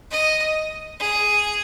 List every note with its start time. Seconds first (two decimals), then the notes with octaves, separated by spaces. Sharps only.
0.11 D#5
0.99 G#4